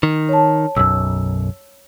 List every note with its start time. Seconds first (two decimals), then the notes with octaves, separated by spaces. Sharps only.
0.03 D#3
0.29 C#5 A5
0.77 B1 F#2 E6